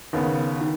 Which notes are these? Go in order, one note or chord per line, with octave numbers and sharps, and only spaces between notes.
D#2 C#3 B3
D#3